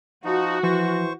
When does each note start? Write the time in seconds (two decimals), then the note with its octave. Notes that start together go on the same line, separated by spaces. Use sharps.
0.25 F3 D#4 F#4
0.63 E3 F3 C5 C#6